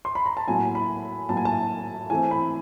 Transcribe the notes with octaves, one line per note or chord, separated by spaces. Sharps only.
C6
B5
A#5
A5
A2 F#3 A#3 G#5
B5
A2 F#3 A#3 A5
G#5
A5
E3 A3 C4 G#5
B5